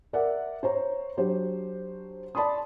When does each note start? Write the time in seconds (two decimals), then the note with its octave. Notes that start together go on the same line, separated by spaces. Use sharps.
0.13 A#4 D5 E5 F#5
0.63 C5 C#5 A#5
1.17 F#3 D4 F#4 G4 C5
2.35 D5 A5 B5 C6 D#6